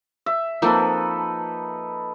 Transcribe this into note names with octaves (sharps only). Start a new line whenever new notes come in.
E5
F3 A#3 C4 D#4 A4 B4